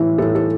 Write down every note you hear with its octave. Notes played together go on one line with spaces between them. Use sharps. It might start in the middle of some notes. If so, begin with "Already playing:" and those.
Already playing: A2 E3
A2 A4
A4